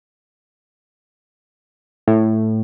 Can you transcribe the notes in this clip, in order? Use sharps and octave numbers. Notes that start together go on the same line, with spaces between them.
A2